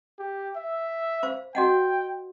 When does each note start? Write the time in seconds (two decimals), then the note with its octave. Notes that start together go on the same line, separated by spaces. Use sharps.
0.19 G4
0.56 E5
1.23 C5 F5
1.55 F#4 D#5 F#5 G5